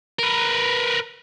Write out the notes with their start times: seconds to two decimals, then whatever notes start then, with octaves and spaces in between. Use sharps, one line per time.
0.19 A#4 B4